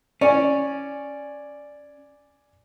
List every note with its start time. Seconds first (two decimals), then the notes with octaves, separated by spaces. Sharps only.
0.21 C#4 D5 G#5